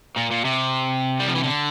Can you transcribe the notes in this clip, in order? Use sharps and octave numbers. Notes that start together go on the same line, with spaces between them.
A#2
A#2
C3
G3
F3
E3
D3